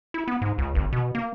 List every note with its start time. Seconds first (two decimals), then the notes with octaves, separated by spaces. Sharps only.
0.14 E4
0.28 B3
0.42 G#2
0.58 C#2
0.75 G1
0.93 B2
1.15 A#3